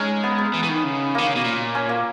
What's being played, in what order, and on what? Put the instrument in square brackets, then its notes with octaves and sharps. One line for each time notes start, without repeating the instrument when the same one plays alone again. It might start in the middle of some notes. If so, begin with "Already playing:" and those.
Already playing: [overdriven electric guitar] G#3 [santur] C#4 D#4
[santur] B3
B3
[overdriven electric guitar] E3
E3
D#3
C#3
[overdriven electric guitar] D#3 [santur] A#3
[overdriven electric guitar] C#3
B2
A#2
[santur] C#4
A#3